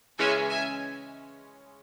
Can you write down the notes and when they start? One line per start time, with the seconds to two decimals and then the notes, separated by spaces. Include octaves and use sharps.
0.18 C#3 E3 G#3 C#4 E5 G#5
0.50 E5 G#5